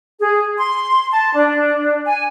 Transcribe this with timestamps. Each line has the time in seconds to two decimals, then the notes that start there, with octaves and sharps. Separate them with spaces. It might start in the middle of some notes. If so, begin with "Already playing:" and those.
0.20 G#4
0.58 C6
1.12 A5
1.35 D4
2.06 G#5